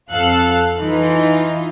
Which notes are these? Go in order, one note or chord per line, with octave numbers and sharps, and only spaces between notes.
F2 A4 F5 F#6
E3 D#4 F4